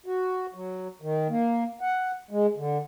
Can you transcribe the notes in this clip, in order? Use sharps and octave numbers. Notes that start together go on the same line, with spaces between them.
F#4
F#3
D#3
A#3
F#5
G#3
D3